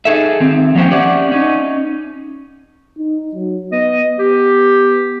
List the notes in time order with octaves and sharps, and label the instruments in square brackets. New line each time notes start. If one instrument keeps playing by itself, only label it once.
[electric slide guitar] D#4 G#4 A4 E5
D#3 C4
F3 F#3 A#3 C#4 C5 G5
C#4 G4 D5 E5 F#5
C#4 D#4
[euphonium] D#4
F#3
[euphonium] B3 [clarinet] D#5
[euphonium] B3 [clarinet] G4